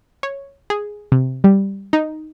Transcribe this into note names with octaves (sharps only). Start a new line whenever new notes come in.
C#5
G#4
C3
G3
D#4